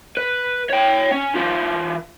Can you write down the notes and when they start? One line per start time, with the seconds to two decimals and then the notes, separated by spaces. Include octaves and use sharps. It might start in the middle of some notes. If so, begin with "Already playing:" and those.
0.17 B4
0.69 C#5 G5
1.11 C#4
1.36 E3 F4